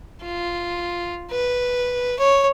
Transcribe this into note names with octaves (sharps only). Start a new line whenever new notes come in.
F4
B4
C#5